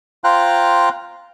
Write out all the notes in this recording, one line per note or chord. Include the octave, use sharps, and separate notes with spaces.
F4 C5 F5 G5 A#5 F#6